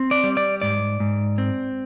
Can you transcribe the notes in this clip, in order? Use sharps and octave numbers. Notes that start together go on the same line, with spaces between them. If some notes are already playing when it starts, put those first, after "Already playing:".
Already playing: C4
D5
G3
D5
G#2 D5
G#2
C4